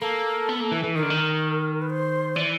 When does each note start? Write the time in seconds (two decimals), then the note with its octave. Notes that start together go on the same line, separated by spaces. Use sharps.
0.01 A#3 A4
0.49 B3
0.60 A#3
0.72 E3
0.84 E3
0.95 D#3 A#4
1.03 D3
1.10 D#3
1.81 B4
1.90 C5
2.35 E3 D5